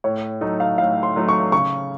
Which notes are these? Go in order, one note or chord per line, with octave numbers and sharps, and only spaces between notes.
A2 C#5
F#3 A3 D#4
F5
A2 F5
C6
F#3 A3 D#4
C#6
C#3 C#6